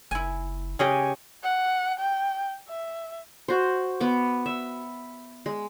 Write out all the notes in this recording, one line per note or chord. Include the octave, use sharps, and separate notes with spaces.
F#1 E4 G#5
C#3 G4 G#4 C#5 D#5 G#5
F#5
G5
E5
F#4 C5
B3 D6
E5
G#3